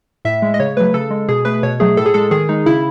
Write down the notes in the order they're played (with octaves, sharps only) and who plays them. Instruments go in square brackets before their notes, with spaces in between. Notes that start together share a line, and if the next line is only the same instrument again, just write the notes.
[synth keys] A2 E5
G#3
D#5
C#3 C#5
F#3 A3 B4
C#3 A4
G#3
B2 G#4
A3 B4
B2 C#5
F#3 A3 G#4
A2 A4
G#4
G#3 A4
D#3 G#4
G#3 D#4
C#3 E4